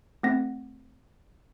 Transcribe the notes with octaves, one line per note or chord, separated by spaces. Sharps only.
A3 C4 F#5 A#6